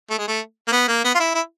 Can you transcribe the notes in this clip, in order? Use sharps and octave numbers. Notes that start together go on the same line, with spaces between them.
A3
G#3
A3
A#3
B3
A#3
B3
F4
E4
E4